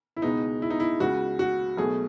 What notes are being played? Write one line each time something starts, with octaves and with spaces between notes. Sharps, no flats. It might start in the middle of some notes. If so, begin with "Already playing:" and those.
E4
C#2 B2 G#3 B3 D#4
E4
D#4
E4
C#2 C#3 G#3 F#4
F#4
B1 B2 A3 G#4